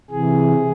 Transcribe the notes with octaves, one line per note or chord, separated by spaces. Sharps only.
C3 E3 G#4